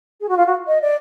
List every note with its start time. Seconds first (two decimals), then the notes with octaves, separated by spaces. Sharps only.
0.20 G#4
0.28 F#4
0.36 F4
0.46 F#4
0.67 D#5
0.81 D5